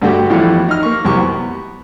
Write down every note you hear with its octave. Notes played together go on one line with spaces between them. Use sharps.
G2 D3 A3 F#4 G4 G5
F2 A2 E3 G3 A3 B3
D#4 F6
A#3 C#6
C2 F#2 G4 C#6
B3